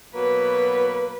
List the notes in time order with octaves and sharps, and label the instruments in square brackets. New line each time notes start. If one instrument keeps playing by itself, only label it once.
[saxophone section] B2 F#3 A#3 [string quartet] B4